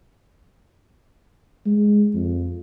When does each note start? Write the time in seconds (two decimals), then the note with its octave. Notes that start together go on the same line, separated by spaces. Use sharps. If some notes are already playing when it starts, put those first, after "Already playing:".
1.66 G#3
2.14 F2